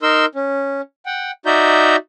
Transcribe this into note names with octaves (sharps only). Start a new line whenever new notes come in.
D#4 A#4 C6 E6
C#4
F#5 G5
D#4 F#4 D5 E5 A#5 G6